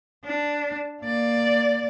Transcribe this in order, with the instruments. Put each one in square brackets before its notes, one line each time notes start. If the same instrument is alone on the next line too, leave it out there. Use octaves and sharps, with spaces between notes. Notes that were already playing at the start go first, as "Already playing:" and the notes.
[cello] D4
A#3 D5